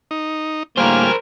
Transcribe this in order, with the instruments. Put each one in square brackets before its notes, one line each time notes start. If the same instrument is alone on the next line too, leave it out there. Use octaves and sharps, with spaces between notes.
[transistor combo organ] D#4
[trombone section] A2 D3 A#3 [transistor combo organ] G3 G#5 F6 [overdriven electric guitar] A#4 C5